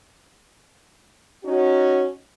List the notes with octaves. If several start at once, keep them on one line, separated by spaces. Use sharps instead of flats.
C#4 D#4 F#4